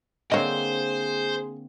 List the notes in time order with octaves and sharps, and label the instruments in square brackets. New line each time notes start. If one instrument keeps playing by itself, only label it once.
[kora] D3 A#3 C4 [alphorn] G#4 [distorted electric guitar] C5 [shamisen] C#5 D#5